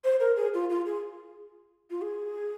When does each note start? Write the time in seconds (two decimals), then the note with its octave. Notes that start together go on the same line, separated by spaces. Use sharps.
0.05 C5
0.20 A#4
0.37 G#4
0.54 F4
0.70 F4
0.86 G#4
1.90 F4
2.02 G#4